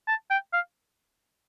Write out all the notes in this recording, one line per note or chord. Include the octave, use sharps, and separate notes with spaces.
A5
G5
F5